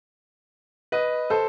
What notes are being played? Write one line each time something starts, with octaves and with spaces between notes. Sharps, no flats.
B4 D#5
A4 C5